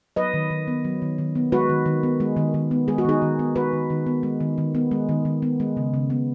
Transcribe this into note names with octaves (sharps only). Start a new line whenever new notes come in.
F#3 B4 D#5
D#3
D#3
B3
F#3
D#3
D#3
B3
G#3 F#4 B4
D#3
D#3
B3
G#3
D#3
D#3
B3
G#3 G#4
F#4
D#3 D#4 G#4
D#3
B3
G#3 F#4 B4
D#3
D#3
B3
G#3
D#3
D#3
B3
G#3
D#3
D#3
B3
G#3
C#3
C#3
B3